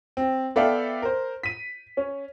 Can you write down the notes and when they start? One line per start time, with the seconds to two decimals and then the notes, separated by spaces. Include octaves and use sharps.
0.17 C4
0.56 B3 A4 D5 E5 F5 G5
1.02 A#4 C5
1.43 B6 D#7
1.97 C#4